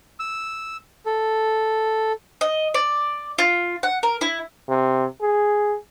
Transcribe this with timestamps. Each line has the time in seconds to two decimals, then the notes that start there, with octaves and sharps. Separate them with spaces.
0.20 E6
1.06 A4
2.41 D#5
2.74 D5
3.38 F4
3.83 F#5
4.03 A#4
4.21 E4
4.69 C3
5.21 G#4